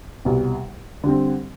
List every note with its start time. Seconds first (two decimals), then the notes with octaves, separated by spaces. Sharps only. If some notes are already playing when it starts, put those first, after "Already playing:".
0.25 C2 B2 G3
1.04 D3 G3 C4